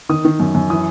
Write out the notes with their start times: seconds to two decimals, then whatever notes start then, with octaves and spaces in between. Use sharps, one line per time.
0.09 D#3 D#6
0.25 D#3
0.40 F#2
0.55 F#2
0.70 E3 D#6